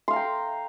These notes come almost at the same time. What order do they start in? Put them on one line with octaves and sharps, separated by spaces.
C6 F5 A#5 G5